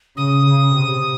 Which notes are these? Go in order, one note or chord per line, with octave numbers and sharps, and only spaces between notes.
C#3 D#6
C#3
C3